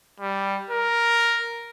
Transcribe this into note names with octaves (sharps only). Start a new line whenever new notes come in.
G3
A#4